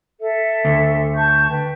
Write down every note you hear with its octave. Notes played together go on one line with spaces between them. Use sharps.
A4 E5
D2
A5 C#6 G6
B4 G5